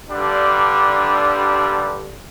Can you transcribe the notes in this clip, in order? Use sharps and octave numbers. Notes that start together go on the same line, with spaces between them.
G2 D3 G3 D4